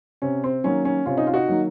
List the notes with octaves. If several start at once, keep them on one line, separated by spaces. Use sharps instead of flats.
C3 C#4
C4
D#3 F#3 A#3 C#4
C#4
C3 C#4 F4
D#4
F4
D#4 F#4
D#3 F#3 A#3